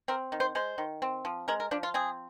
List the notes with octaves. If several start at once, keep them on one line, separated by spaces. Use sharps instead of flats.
C4 A#4
D#3
C5
G#3 C5
D#3
C4
F3
G#3 A#4
A#4
F3 D4
F4
C4 G#4